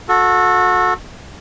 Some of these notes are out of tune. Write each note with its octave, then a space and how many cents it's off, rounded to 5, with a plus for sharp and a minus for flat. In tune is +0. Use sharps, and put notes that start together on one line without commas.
F#4 -30 A4 +0